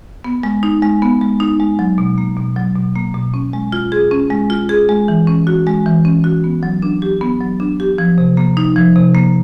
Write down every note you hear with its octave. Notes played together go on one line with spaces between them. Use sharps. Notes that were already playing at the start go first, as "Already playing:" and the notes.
B3
G#3
D#4
G#3
B3
G#3
D#4
G#3
F#3
B2
A#3
B2
F#3
B2
A#3
B2
C#4
G#3
F4
G#4
C#4
G#3
F4
G#4
G#3
E3
C#4
F#4
G#3
E3
C#4
F#4
B3
F#3
D4
G4
B3
F#3
D4
G4
F3
C3
A#3
D#4
F3
C3
A#3